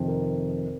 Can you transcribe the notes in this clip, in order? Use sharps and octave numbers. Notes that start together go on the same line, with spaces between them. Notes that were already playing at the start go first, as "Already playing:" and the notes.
Already playing: F2 C3 D#3
A#4